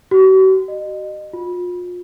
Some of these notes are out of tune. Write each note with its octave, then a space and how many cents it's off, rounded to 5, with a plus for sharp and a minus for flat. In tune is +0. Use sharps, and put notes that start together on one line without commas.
F#4 +45
D#5 -30
F4 +35